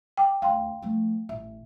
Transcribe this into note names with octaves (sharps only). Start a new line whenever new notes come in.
G5 D6
D2 F5 G5 C6
F3 A3
A1 E5